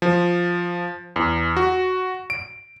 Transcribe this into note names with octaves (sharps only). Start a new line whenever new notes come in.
F3
E2
F#4
D7